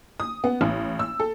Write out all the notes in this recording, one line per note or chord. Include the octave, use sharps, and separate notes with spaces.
D#6
B3
A1
E6
A4